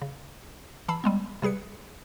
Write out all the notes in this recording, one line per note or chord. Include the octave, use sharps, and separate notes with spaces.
C#3
E3 A5 B5 E6 C7
G3 G#3 B3
C3 G3 G#4 B4 C#7